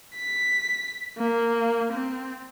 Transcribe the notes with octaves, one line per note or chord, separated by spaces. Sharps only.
B6
A#3
C4